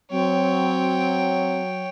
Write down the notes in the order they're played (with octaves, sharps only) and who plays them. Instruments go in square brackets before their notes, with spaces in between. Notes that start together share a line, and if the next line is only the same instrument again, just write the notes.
[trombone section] F#3 [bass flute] C4 [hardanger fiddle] C#5 G5